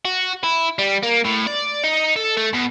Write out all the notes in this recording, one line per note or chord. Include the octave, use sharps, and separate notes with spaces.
F#4
E4
G3
A#3
A2
D5
D#4
A4
A3
B2